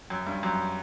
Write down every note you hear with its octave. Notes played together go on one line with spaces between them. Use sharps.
F#2
G2
F#2